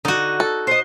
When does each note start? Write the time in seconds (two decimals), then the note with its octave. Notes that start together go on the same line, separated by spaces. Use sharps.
0.05 D3 D#4 F#4
0.40 A4
0.67 C5 D#5 C7